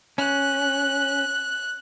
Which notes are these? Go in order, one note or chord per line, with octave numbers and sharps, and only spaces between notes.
C#4 F#6